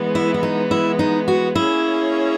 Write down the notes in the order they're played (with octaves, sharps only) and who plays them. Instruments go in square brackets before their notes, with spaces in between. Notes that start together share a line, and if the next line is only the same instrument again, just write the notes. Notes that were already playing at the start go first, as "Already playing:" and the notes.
Already playing: [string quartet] E3 G#3 B3
[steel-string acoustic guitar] E4
E4
D#4
E4
D#4
F#4
[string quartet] A#3 C#4 G#4 C#5 [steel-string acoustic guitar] E4